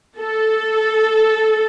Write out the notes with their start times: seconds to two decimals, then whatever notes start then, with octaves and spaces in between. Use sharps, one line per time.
0.18 A4